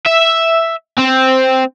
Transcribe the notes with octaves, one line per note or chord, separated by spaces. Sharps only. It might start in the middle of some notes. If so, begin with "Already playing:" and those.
E5
C4